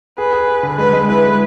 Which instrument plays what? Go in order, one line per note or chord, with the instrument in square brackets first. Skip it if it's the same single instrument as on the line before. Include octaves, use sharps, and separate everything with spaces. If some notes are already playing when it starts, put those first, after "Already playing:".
[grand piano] G#4 [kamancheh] B4
[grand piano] G#4
G#4
D3
[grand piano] G#3 [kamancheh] B4
[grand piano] G#3
[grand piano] E4 [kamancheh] B4
[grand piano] G#3